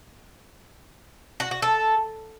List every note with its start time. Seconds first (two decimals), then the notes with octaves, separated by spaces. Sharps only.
1.40 F#4
1.51 F#4
1.62 A4